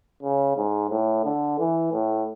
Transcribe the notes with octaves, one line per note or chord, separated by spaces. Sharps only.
C#3
G#2
A2
D3
E3
A2